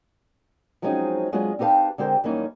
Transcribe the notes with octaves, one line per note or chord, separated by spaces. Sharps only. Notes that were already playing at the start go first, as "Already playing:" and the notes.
F3 F#3 G#3 C4 C#4 D#4
F#3 G#3 C4 D4 F4 G#4
C4 D#4 G4 B4 F5 A5
D3 G#3 C4 G4 A#4 C5
F#2 E3 G3 A#3 C#4 D#4